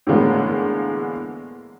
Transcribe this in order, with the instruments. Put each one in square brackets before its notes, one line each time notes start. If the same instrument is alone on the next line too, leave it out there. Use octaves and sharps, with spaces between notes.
[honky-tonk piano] A2 D3 E3 G#3 A#3 B3